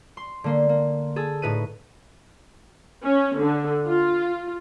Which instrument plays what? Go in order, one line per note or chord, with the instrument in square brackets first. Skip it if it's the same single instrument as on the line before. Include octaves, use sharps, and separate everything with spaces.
[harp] C6
D3 A#3 C6
A#3
G#4 A4
A2 D#4 B4 D#7
[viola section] C#4
D3
F4